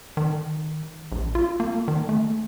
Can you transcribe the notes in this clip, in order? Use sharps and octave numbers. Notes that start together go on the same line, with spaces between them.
D#3
A#1
F4
A#3
D#3
A3